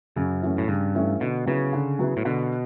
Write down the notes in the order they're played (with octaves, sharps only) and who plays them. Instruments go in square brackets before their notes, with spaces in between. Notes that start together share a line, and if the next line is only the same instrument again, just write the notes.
[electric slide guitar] F#2 [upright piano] C#3
[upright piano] E3 A3 C#4
[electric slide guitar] A2
[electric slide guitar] G2 [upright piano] C#3
[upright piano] E3 A3 C#4
[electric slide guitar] B2 [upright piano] D3
[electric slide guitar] C#3 [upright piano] F#3 B3 E4
[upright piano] D3
F#3 B3 E4
[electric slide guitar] A2
[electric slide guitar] B2 [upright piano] D3